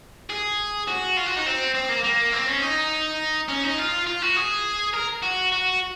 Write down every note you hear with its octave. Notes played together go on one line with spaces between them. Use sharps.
G#4
F#4
F4
F#4
D#4
C4
C4
A#3
A#3
C4
C#4
D#4
C#4
D#4
F4
F4
F#4
G#4
A#4
F#4
F#4